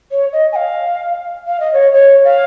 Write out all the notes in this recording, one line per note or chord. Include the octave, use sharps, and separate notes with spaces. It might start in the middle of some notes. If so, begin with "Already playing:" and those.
C#5
D#5
G#5
F5
F5
D#5
C#5
C#5
F5